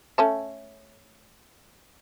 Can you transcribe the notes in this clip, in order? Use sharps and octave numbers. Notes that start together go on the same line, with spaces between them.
A3 C#4 A5